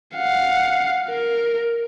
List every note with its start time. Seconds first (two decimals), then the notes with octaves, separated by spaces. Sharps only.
0.16 F5 F#5
1.09 A#4